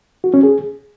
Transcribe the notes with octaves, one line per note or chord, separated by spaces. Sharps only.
F#4
C#4
G#4